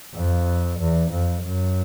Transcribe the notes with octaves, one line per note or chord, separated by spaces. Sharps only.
F2
E2
F2
F#2